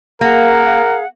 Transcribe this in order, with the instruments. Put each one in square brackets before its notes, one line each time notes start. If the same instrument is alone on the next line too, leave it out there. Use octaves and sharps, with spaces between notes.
[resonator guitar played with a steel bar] A#3 [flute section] G#4 F5 F#5 [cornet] A#4